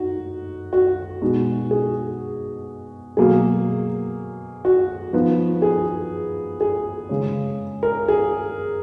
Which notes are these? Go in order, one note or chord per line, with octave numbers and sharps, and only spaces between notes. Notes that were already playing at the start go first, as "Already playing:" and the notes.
Already playing: D#4 F#4
F#4
B2 G#3 D#4
G#4
B2 F#3 A#3 G#4
F#4
F3 B3 D#4
G#4
G#4
C#3 G#3 C#4
A#4
G#4